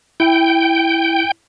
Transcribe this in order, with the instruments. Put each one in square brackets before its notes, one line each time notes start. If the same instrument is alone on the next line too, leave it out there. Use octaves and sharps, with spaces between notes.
[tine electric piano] E4 [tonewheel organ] G5